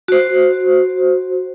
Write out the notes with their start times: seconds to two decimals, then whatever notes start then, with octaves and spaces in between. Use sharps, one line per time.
0.08 F#4 C5